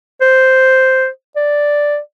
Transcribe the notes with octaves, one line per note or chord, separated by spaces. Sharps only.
C5
D5